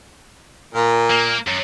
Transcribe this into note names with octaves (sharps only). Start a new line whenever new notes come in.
A#2
A#3
F#2